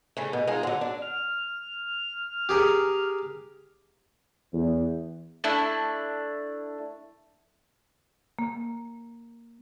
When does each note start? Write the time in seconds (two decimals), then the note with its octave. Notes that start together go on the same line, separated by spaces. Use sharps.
0.17 C#3 E3 A3
0.33 B2
0.47 G#3 D#4 F4 G#4
0.63 D3 F#3
0.81 D4
1.02 F6
2.49 G4 G#4 A#4
4.53 E2
5.44 A3 D4 E4
8.39 A#3